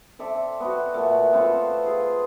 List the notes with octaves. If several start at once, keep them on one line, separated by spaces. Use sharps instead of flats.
C4 A4 D5 E5
B3 F#4
A#2 A3
B3 C4 F4 A4
F4 G#4